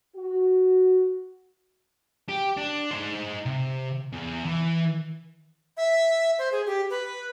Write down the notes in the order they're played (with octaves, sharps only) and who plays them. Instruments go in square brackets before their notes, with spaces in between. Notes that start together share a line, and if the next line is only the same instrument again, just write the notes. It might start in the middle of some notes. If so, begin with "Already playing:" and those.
[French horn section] F#4
[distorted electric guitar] G4
D4
D#4 C5
C3
E2
E3
[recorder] E5
C5
G#4
G4
B4